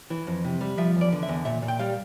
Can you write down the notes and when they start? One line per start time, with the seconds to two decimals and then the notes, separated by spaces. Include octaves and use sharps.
0.10 E3
0.27 F2
0.44 C3
0.61 G3
0.78 F3 E5
0.95 E2
1.01 D5
1.12 D3
1.23 E5
1.28 E2
1.45 A#2 E5
1.62 A#2
1.68 G5
1.79 G3 F5